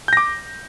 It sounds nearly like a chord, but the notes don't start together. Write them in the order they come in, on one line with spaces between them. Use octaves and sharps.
G6 A#6 D6